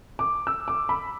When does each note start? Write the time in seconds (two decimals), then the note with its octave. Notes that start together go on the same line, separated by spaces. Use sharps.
0.19 D6
0.47 E6
0.68 D6
0.89 B5